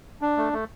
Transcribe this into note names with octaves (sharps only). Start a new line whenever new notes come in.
D4
A3
A3